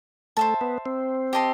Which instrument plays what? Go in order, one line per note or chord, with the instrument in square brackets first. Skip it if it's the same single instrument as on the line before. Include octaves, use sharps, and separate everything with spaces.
[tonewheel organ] A3 [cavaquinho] C5 E5 A5
[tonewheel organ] B3
C4
[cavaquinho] G4 D#5 A5 C6